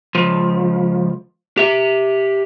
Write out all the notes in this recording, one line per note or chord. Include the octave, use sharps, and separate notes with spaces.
C#2 F3
G4 E5